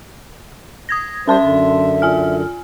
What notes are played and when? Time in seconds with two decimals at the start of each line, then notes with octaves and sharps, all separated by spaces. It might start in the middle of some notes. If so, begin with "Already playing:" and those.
0.89 D#6 G#6 A#6
1.27 G3 C#4 C5 E5 A5 C6
1.42 F#2 D3
2.02 F4 G#5 F6